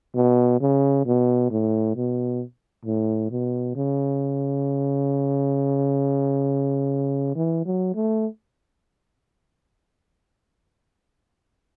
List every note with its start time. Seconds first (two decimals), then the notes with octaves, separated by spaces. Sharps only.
0.15 B2
0.61 C#3
1.06 B2
1.51 A2
1.96 B2
2.85 A2
3.31 B2
3.76 C#3
7.35 E3
7.66 F#3
7.95 A3